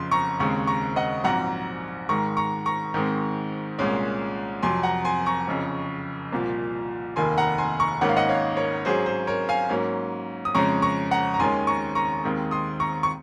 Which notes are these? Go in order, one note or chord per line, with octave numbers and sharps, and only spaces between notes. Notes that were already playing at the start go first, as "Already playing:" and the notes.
Already playing: F#1 F2 C#3 C6
A#5 C#6
D#2 C#3 G#3 C4 A#5 C#6
A#5 C#6
D#5 F#5
A#1 G#2 F#3 C4 F#5 A#5
G#2 D#3 G#3 A#5 C#6
A#5 C#6
A#5 C#6
G#2 D#3 G#3 C4
C2 A#2 G#3 C#4
F2 C3 F#3 G#5 C6
F#5 A#5
G#5 C6
A#5 C#6
F#1 F2 C#3
C2 A#2 F3
F1 D#2 D#3 A#3 G#5 C6
F#5 A#5
G#5 C6
A#5 C#6
G#1 G#2 D#3 A#3 C#4 F#5
F5
D#5 F#5
C#5 F5
A#4 C#5
G#2 F#3 C#4 G#4 C5
G#4 C5
A#4 C#5
F5 G#5
G#2 F#3 A#3 C#4
D#6
F2 C#3 G#3 C#4 A#5 C#6
A#5 C#6
F#5 A#5
A#5
D#2 D#3 G#3 C#4 G#5 C6
A#5 C#6
A#5 C#6
D#2 D#3 G#3 C4
C6 D#6
A#5 C#6
C#6